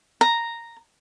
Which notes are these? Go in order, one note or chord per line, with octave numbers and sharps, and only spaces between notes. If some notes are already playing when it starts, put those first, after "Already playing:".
A#5